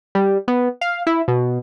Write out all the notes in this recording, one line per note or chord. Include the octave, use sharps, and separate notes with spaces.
G3
B3
F5
E4
B2